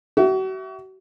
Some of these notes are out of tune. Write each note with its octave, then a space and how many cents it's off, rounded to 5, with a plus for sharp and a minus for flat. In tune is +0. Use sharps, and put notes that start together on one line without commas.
F#4 +40 E5 +0